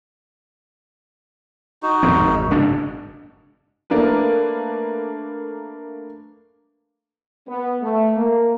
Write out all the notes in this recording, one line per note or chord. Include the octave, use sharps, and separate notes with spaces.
D#4 F#4
D#1 F2 C4
G#1
F#1 G#2 D4
A3 A#3 D4 A#4 B4
B3
A3
A#3